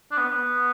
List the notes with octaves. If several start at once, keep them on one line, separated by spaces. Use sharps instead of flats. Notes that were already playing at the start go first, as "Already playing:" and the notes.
D4
B3
B3